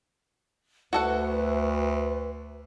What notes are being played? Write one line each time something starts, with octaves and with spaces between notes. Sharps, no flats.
D2 F#4 A4 B4 F#5